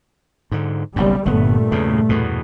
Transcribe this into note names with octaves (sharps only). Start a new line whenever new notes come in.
G#2 D3
F#1 B1 F#2 G3
G1 G2 A#2 A3 B3
E2 C#3
E2 B2